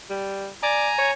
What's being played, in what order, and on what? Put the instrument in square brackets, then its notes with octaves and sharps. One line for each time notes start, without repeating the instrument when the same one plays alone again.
[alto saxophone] G3
[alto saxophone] D5 [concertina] G#5 A#5
[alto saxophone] C#5